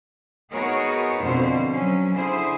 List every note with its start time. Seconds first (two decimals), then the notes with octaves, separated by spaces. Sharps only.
0.53 B3 D#4 F#4 G#4 A#4 C#5
1.23 F2 B2 D3 C5
1.71 F#3 C#4
2.14 D3 E4 G#4 C5